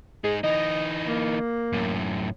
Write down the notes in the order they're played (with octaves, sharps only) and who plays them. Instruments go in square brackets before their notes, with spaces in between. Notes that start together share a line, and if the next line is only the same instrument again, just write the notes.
[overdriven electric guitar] G#3 D#4 [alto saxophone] G#4
[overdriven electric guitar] E3 D#4 [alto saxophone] D#5
[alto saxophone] A#3
[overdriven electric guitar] F#2 A2